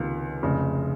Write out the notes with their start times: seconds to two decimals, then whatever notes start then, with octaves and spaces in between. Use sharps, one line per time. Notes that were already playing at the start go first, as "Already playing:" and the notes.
Already playing: C#2 C3 D#3 A#3 F4
0.42 F1 F2 C#3